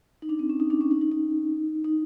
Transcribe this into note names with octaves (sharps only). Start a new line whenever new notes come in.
D#4
D4
C4
C#4
D#4
D4
C#4
D#4
D#4
D#4
D#4